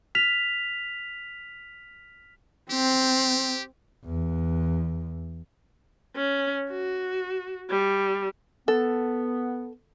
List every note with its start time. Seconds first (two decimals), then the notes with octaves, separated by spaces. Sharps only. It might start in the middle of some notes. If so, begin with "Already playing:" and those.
0.15 F6 B6 F7
2.71 C4 G4
4.05 E2
6.16 C#4
6.70 F#4
7.70 G3
8.68 B3 A4